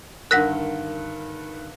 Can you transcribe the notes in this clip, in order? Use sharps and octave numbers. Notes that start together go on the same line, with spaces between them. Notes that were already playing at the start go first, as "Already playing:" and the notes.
G2 D3 D#3 A#4 F#5 F#6 A#6 B6